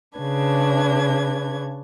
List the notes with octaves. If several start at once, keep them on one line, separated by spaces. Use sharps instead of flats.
C#3 D4 B4 G#6